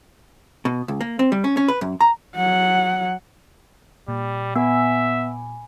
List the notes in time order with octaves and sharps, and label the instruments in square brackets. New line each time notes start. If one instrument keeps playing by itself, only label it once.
[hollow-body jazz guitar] B2
C#2
A#3
C4
G3
C#4
C#4
B4
F#2
A#5
[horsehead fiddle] F#3 F#5
[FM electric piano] A#2 [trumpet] G3
[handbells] B3 [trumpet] E5 [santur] G#5 B5 D6